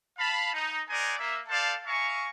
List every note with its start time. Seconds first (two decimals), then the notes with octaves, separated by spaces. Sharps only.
0.18 F5 A5 B5
0.52 D#4
0.89 A#4 C5 D5 D#5 F#5 G#5
1.18 A#3 E5
1.48 A4 C5 D5 F5 A5
1.86 E5 F5 G#5 A#5 C#6